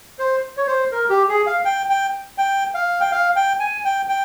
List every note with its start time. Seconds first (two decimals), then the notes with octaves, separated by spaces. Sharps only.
0.19 C5
0.57 C#5
0.67 C5
0.92 A#4
1.10 G4
1.29 G#4
1.47 F5
1.65 G5
1.89 G5
2.38 G5
2.75 F5
3.00 G5
3.12 F5
3.36 G5
3.60 G#5
3.85 G5
4.09 G5